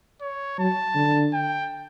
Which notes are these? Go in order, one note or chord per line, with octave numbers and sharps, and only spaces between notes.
C#5
F#3 A5
D3
G5